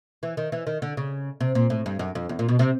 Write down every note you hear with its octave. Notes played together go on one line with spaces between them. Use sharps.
E3
D#3
E3
D#3
D3
C#3
C3
A#2
A2
G2
F#2
F2
E2
A#2
B2
C3